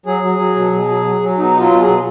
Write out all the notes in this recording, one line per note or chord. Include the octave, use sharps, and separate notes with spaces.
F#3 G#4
F#3
F#3
B2
B2
F#3
F#3
F#3
B2 D#4
F#3
F4
B2
G#4
B2